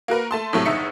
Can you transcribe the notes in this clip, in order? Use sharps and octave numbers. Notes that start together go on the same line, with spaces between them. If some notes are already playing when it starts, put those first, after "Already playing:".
A#3 F#4 A#4 B4
A3 A5 C6
A2 C3 F#3 A3
G1 E2 D#4 E5 C#7